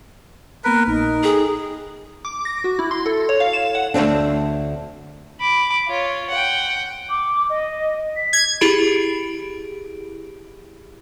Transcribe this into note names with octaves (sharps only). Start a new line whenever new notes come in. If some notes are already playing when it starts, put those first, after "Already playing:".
A#3 B3 A#4 B4 B6
A#1 A#2 D#4 A#4
G#4 A4 G5 G#5
D6
A#6
F#4
E4
C6
A4
C#5
F5
E7
F#5
D2 G#2 C4 D4
B5 D6
F4 C#5
F#5 G5
D6
D#5
B6
G#6
E4 G4 G#4 B5 D7